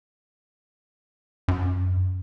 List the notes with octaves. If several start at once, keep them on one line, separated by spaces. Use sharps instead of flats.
F#2